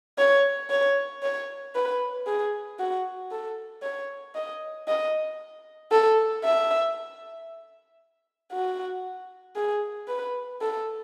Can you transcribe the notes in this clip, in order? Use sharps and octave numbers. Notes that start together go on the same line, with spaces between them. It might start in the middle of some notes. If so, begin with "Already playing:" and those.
C#5
C#5
C#5
B4
G#4
F#4
A4
C#5
D#5
D#5
A4
E5
F#4
G#4
B4
A4